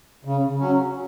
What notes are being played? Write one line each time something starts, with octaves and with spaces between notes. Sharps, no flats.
C#3
F#3 C#4